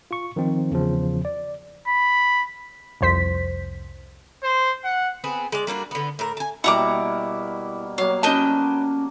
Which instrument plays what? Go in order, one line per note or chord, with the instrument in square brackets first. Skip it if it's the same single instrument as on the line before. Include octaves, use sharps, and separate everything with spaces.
[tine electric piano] F4 C#6
D#3 F3 C4 D#4
E2 C#3 F3
D5
[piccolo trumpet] B5
[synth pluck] C2 F2 C5 B6
[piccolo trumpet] C5
F#5
[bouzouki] B3 C4 G#4
G#3 D5
G3 A#3 D4 F#4
D3 B3
A2 A#4
G#5 A5
[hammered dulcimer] B2 G3 A#3 [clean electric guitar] E4 [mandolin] F#5 A#5 D6
[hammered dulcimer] F#3 A#3 [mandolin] F5
[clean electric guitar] C#4 A5 [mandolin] B4 D#5 G5